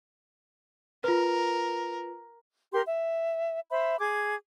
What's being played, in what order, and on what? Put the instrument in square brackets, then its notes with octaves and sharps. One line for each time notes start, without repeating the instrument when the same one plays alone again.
[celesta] F4 B4 [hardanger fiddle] A#4
[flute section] G4 A#4 C6
E5
C5 E5 B5
G#4 D6 G#6